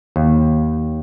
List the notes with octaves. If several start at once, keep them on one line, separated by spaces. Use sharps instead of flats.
D#2